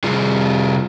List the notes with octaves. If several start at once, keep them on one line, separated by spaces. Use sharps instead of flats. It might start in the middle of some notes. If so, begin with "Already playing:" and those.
C3 G3 F4 G#4